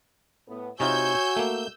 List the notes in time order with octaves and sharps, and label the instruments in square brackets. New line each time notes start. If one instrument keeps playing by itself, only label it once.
[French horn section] A2 B3
[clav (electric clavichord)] C3 D#4 F4 [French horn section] F#4 [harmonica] C#5 G#5 [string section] E6 G6
[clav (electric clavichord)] A3 A#3